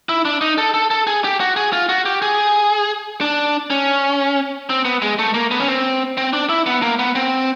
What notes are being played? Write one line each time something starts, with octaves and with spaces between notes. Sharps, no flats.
E4
D4
D#4
A4
A4
A4
G#4
G4
F#4
G#4
F4
F#4
G4
G#4
D4
C#4
C4
B3
G#3
A3
A#3
B3
C#4
C4
C4
D4
E4
B3
A#3
B3
C4